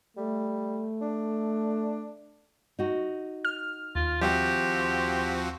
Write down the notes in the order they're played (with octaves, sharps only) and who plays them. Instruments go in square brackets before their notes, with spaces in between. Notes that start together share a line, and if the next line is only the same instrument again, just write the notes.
[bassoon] G3 [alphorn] A3
[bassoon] D4
[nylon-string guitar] D#4 F#4
[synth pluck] F6
[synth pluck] D#2 [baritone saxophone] F4
[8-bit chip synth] F3 C4 F#4 [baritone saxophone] G4 [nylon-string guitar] E5 F5 G5